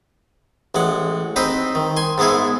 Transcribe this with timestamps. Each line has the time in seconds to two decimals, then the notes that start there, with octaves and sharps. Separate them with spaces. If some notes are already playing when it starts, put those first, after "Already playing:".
0.75 A1 G#3 F#5
1.36 C4 D#4 B4 C5 G5
1.75 D#3
1.97 G#5 C6
2.18 G#2 G#3 B3 E4 G#4